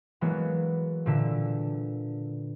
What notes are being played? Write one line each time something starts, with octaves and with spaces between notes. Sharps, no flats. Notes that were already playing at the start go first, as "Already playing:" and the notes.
E3 F#3 G#3 A#3 B3
A#2 D3 E5